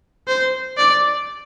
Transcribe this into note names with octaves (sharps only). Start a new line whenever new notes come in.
C5
D5